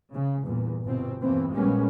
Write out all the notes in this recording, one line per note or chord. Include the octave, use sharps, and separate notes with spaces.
C#3
E2 G2 A#2
G1 B2 C4
E2 G2 B2 E3 A#3 C4
A#1 G3 G#3 A#3 B3 C#4